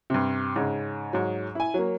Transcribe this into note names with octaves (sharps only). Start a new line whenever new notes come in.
G2 C3
G#2 C#3
G#2 F#3
E4 G#5
F#3 A#3